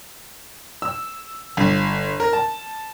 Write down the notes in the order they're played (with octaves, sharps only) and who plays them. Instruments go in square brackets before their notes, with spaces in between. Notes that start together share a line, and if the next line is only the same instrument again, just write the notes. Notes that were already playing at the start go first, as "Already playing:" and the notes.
[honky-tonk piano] E6
G1
A#4
A5